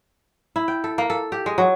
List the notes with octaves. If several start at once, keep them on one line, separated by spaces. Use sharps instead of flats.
E4
G5
A4
A#3
A4
G4
G#3
F#3